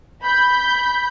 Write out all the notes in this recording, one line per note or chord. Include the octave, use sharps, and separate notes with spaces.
B5 G6